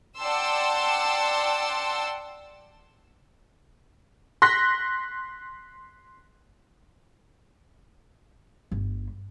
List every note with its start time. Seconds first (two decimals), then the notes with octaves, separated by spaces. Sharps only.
0.18 D5 F#5 G5 A5 C6 E6
4.42 C6 F#6 A#6 B6
8.71 G1